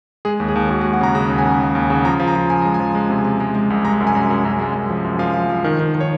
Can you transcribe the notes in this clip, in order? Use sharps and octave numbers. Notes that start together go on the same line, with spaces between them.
G#3 G#4
D#2
G#4
D#2
D#2 F#4
G#4
G#3
F#5
C#3 A#5
C#3 A#5
D#2
G#5
C#3
D#2
D#2
C#3
F3 A#5
F3
A#5
F3
F3 G#5
G#3 A#5
G#5
F3
G#3
C3
C3
G#3
G#3
C2
G#3 A#5
F#2
G#5
F#2
F#2
F#2
G#3
F#2
F3
F#2
F3 F5
F3
F3
D#3
D#3
D#3
C#5